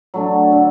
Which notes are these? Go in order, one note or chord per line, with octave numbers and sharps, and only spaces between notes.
F#3 A3 D4
D3